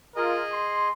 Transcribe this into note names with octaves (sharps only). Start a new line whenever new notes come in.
F4 G#4 A#4 D#5
C6